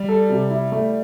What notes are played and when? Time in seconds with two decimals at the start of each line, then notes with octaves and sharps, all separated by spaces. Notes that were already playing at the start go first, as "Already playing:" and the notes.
Already playing: G3
0.09 A4
0.30 C3
0.51 E4
0.72 A3